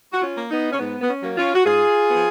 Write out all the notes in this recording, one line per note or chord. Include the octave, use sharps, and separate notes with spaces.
F#4
C#4 F4
A#3
B3 D#4
C#4
G#2 B3
B3
C#4
F#3 A#3
C#4 F4
F#4
G#2 F4 G#4
B3
F3